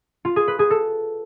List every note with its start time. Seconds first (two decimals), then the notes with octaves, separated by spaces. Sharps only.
0.25 F4
0.36 G#4
0.48 B4
0.59 G#4
0.71 A4